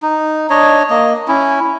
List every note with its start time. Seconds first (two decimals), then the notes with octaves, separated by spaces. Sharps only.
0.02 D#4
0.50 D4 C#5 D#5
0.90 A#3 D#5
1.28 C#4 E4